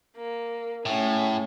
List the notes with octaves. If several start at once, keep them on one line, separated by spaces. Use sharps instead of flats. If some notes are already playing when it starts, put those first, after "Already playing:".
A#3
A2 A3 C#4 G#4